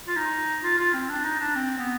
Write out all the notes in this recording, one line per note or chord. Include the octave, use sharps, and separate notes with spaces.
F4
D#4
F4
F4
C4
D4
D#4
D4
C4
B3